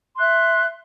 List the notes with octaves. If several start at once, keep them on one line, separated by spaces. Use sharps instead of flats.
E5 C6 F#6